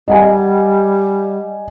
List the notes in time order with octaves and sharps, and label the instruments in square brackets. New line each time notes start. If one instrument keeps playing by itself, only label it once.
[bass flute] G3 [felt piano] D#5 F#5 G#5